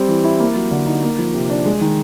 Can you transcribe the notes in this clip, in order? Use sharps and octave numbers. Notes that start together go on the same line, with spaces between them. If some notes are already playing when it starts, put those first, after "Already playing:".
Already playing: G3 C4
E3
E4
A#3
F#3
D3
D#4
A#3
F3
C3
D4
G#3
D#3